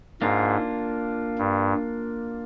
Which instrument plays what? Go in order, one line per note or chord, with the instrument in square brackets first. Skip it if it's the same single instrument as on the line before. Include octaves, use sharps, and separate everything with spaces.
[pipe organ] G#2 [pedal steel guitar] A#3 D4 F4
[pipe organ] G2